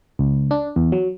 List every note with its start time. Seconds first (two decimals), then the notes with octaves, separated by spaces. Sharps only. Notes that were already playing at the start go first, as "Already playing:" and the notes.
0.19 C#2
0.51 D4
0.76 E2
0.92 F#3